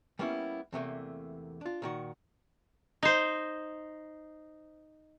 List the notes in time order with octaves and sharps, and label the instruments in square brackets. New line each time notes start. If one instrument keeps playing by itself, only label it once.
[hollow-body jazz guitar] G3 A#3 B3 C#4 E4
E2 C3 A3 A#3
D4 F4
A#2 D#3 F#4
[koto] D#4 C5